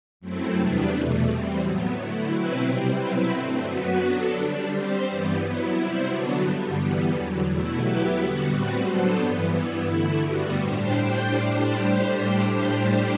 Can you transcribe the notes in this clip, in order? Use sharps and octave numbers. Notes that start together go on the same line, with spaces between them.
F#2 F#3 A3 C4 E4
E2 C3 G3 B3 D4
E2 B2 A3
E3 G3 C4
A2 F#3 B3
D3 A3 E4
B2 F#3 C4 E4 B4
C3 G3 C4
B2 F#3 C4 E4 B4
G2 D3 A3 C4
F#2 F#3 B3 F#4 B4
F#3 B3 D4 A4
D3 G3 D4
G3 C4 G4 C5
G2 E3 G3 B3
F#3 B3 E4
C3 G3 C4 E4
D3 F#3 B3 D4 F#4
G2 D3 G3
E3 G3 B3
E2 D3 F#3
E2 B2 A3 E4
F#3 B3 E4 G4 B4
D3 G3 B3 F#4
A2 G3 C4 F#4 B4
F#3 B3 D4 A4 C5
G2 E3 B3
G2 E3 B3 E4
D3 A3 E4
G2 D3 G3 B3 F#4
A2 G3 D4 G4 C5